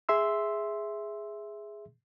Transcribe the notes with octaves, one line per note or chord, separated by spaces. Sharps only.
G#4 E5 C6 E6